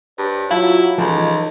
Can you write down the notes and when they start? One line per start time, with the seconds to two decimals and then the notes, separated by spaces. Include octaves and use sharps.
0.18 G2 C5 C#5
0.51 F#3 E4 F4 F5 A5
0.98 C#2 E3 F3 D#4 A4 D#5